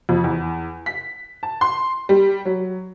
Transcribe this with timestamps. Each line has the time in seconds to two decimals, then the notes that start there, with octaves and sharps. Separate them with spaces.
0.09 F2
0.24 E2
0.86 B6
1.43 A5
1.61 C6
2.09 G3
2.45 F#3